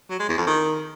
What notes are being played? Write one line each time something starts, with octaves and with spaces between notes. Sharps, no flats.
F#3
G#3
E2
F2
D#3